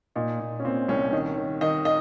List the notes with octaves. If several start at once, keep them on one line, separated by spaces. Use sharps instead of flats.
A#2 D#4
A#2
C#4
A#2 C4
C2 C#4
D#3 D#4
D#3
D#3 D#5
D#5